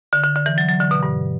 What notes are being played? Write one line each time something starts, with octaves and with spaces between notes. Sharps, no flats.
D3
D3
D3
E3
F#3
F#3
D3
B2
G2